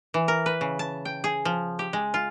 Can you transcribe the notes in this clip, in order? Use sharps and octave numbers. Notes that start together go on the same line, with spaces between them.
E3
A#4
B4
C#3
A5
G5
G#4
F3
G4
G#3
F4